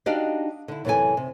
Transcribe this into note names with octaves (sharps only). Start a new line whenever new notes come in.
D4 D#4 F#4 G4 D#5 F5
D3 E4
F#2 C3 E3 E4 A4 G#5
C3